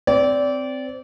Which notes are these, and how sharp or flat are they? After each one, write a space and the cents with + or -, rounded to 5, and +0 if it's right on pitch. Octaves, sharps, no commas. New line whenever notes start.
C4 -10 D5 -25